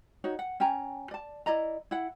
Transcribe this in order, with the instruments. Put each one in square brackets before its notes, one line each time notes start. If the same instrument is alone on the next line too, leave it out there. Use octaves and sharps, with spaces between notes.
[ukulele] D#4 F#4 C#5
F#5
C#4 G5 G#5 A#5
D5 A5
E4 D5 D#5 A#5
E4 F#5